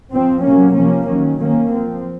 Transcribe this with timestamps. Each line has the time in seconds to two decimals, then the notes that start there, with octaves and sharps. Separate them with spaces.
0.12 F3 C4
0.43 C3 F#3 A#3 C#4
0.75 C3 F3 A#3 C#4
1.07 D#3 F#3 C#4
1.40 D#3 A#3 C#4
1.72 F3 C4